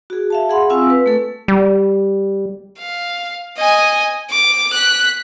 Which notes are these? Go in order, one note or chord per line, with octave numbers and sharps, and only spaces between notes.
F#4 G#4
E5 F5 A5
G#4 E5 F#5 B5 C6
C4 F4 F5 G#5 C#6 E6
B4
A3 A4
G3
F5
D#5 G#5
D6
F#6 B6